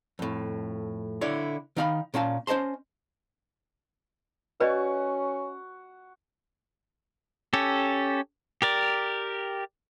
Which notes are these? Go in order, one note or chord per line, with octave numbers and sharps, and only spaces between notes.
F2 A2
D3 E4 C#5 D5
D#3 D#4 F5 A#5 B5
A#2 C#4 F5 A5
C#4 C5 D#5 A5 C6
C#4 F#4 B4 D5 D#5
C#4 G4 A4
G4 A#4 D5